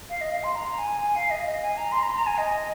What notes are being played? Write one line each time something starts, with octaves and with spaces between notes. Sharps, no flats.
F5
D#5
F5
C6
A#5
G#5
G#5
F5
D#5
D#5
G#5
A#5
C6
A#5
A#5
G#5
D#5